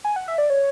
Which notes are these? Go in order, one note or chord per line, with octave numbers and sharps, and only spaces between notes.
G#5
F#5
E5
D5
C#5